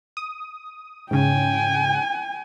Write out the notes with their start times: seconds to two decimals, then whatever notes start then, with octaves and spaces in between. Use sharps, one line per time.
0.17 D#6
1.11 G#2 C#3 G5 G#5